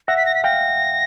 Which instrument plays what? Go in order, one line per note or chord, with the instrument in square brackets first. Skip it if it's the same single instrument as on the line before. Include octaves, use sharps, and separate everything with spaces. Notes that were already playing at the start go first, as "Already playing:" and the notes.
[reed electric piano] E5 F#5 [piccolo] A#6
[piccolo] B6
A#6
B6
[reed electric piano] F5 G5 [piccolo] A#6